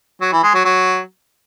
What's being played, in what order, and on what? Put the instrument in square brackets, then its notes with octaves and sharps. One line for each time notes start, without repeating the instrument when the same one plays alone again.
[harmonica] F#3
E3
G#3
F#3
F#3